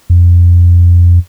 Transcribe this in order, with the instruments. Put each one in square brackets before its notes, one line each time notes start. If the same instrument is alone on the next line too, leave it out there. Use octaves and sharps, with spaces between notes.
[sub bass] F2